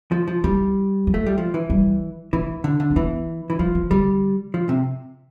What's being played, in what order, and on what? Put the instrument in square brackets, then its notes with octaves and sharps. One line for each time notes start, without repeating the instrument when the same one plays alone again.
[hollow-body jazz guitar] F3
F3
[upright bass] E3 [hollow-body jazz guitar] G3
[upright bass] F3
[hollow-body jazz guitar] A3
G3
F3
E3
[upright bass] G3
[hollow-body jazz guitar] E3 [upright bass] A3
[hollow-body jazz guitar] D3
D3
[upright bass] C4
[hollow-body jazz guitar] E3 [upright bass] B3
[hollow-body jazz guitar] E3
[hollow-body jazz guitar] F3 [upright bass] G3
[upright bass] E3
[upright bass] D3 [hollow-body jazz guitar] G3
[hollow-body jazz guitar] F3
C3